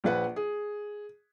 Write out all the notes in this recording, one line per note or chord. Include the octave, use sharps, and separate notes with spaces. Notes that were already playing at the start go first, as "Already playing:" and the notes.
A#1 F3 B4 F#5
G#4